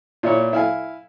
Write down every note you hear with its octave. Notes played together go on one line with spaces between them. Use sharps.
A#2 E4 C#5
E4 F5 G#5